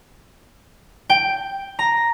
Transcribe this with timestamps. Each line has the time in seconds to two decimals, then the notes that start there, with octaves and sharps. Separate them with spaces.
1.10 G5
1.79 A#5